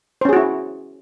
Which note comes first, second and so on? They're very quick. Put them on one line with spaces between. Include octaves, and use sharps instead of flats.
C5 C#4 G#4 F#4 E4